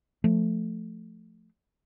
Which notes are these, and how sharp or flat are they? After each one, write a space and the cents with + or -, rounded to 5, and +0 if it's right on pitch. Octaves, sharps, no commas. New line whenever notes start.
F3 +0 A3 +0